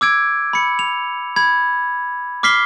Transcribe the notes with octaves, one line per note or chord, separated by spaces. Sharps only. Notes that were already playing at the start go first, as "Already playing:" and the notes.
D6 E6 G#6 D7
B5 C#7
F7
B5 G#6
D6 F6 B6 C7 G7